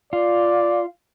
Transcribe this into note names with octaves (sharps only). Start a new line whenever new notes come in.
F4 D5